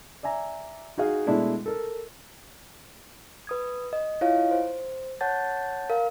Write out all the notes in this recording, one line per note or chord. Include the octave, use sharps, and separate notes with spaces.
D5 E5 G#5 A#5
D#4 F#4 G#4 F5
B2 G#3 A3 D4 E4
A4 A#4
B4 D#6 G#6
D#5
E4 F4 C#5 D#5 F5
C5
C#5 F#5 A5 G6 A6
A#4 F5